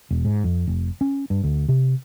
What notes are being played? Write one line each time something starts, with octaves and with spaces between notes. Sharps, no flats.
E1
G#2
F2
F1
C#4
G2
D2
C3